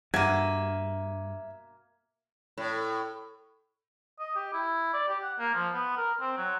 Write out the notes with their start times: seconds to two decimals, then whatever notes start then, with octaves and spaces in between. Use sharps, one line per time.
0.14 G2 B2 A#3 E5 G#6 D#7
2.58 A2
4.20 D#5
4.36 G4
4.53 E4
4.93 D5
5.08 G4
5.23 F#5
5.38 A#3
5.55 F3
5.74 B3
5.97 A#4
6.20 C4
6.38 F#3